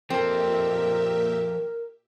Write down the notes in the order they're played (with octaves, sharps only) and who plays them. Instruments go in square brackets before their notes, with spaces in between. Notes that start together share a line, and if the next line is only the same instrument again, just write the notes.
[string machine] A#2 G4 E5 [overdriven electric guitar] F3 A4 [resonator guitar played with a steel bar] C4 [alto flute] A#4